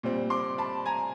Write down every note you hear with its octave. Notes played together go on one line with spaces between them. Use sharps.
A#2 G3 C4
C6 D6
A5 B5
G#5 A#5